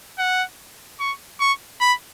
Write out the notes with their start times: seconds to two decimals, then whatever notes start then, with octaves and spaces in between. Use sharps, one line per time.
0.18 F#5
1.00 C#6
1.40 C#6
1.81 B5